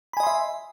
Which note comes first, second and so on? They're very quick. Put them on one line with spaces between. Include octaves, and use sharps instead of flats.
B5 G#5 D#5 C6 E5